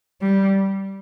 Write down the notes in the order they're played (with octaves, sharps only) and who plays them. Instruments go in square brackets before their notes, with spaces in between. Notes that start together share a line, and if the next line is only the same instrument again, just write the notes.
[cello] G3